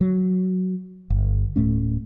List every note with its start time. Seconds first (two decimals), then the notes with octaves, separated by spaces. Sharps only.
0.01 F#3
1.10 G1
1.56 D1 A2 A3 C#4